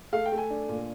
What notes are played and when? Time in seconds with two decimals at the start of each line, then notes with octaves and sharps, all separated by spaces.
0.13 A3 F5
0.26 G5
0.32 A3
0.38 G#5
0.50 D4
0.69 A#2